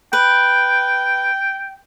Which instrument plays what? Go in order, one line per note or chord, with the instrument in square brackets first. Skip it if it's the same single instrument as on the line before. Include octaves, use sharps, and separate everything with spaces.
[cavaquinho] B4 [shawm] G5